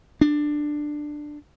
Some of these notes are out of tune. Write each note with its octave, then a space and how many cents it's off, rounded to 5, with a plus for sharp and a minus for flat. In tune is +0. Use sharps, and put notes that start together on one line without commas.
D4 +15